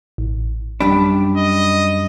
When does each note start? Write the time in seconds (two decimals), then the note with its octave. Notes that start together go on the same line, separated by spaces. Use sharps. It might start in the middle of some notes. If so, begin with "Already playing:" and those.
0.18 A1
0.80 F#2 G3 D4 B5
1.37 D#5